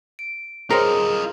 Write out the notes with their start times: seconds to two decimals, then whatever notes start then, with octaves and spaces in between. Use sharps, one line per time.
0.19 D7
0.70 F4 G#4 A#4 C5 C#5 D#5 G5 C6